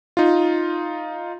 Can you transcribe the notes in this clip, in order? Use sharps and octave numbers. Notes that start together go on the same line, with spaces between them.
D#4 F4